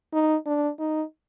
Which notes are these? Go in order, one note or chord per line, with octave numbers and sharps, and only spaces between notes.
D#4
D4
D#4